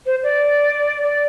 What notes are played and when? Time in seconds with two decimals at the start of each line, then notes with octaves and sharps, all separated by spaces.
0.06 C5
0.23 D5
1.03 D5